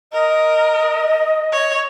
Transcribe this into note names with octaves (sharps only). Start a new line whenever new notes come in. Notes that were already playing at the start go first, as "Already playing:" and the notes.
A#4 D#5
C#5